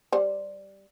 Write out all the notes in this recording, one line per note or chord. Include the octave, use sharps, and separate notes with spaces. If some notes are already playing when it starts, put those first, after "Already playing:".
G3 C5